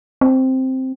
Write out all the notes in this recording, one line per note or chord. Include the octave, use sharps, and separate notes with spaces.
C4